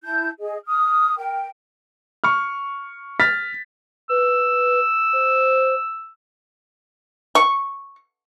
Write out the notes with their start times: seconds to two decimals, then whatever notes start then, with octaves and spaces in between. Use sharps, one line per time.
0.03 E4 A5 G6
0.40 G#4 D#5
0.66 D#6 F6
1.17 A#4 G5
2.24 C#6 F6
3.20 F6 A6 B6
4.09 B4 E6
5.13 C5
7.35 C#6